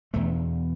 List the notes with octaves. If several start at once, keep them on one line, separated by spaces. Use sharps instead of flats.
E2 B2 A3